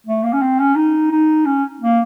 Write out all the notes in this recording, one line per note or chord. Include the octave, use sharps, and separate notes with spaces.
A3
A#3
C#4
C4
C#4
D#4
D#4
C#4
A#3